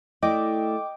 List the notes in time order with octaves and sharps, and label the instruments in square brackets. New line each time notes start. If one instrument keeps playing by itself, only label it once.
[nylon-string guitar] A3 E4 D5 [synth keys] D#5 G5 D6